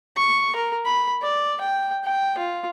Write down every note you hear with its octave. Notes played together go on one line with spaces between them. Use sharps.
C#6
A#4
B5
D5
G5
G5
F4